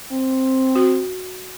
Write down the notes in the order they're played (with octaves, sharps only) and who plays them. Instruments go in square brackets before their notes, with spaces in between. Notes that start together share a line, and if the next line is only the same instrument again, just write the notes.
[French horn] C4
[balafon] F#4